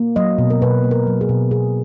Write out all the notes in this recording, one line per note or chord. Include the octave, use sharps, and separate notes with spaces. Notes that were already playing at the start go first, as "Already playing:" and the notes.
Already playing: A#3
F#3 D#5
B2
A#4
B2 B4
A#3
A#4
F#3
G#4
B2
B2 G#4